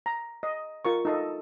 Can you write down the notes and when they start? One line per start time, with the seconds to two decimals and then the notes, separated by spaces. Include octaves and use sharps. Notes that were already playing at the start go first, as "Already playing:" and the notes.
0.06 A#5
0.43 D#5
0.85 F4 A#4 C#6
1.05 D#4 A4 D#5